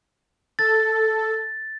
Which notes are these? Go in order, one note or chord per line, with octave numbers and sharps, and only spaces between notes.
A4 A6